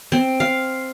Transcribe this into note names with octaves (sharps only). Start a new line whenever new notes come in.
C4
F5